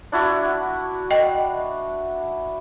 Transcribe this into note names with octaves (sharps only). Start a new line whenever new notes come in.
D4 E4 F#4
D#5 G5